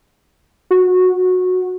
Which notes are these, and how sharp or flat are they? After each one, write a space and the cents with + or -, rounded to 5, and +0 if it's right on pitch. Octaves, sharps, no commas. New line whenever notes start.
F#4 -15